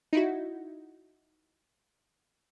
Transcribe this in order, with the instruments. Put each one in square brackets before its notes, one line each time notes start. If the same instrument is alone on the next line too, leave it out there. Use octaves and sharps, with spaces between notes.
[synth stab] D#4 E4 F#4